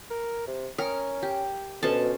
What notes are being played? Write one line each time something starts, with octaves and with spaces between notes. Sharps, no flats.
A#4
C3
C#4 A#4 G5 D#6
G4
D2 B2 C#4 A4 C5 A5